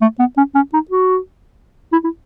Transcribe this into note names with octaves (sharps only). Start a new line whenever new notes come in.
A3
B3
C#4
C#4
D#4
F#4
E4
E4